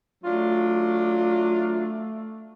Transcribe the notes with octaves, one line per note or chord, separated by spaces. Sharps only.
F#3 A3 D4 F4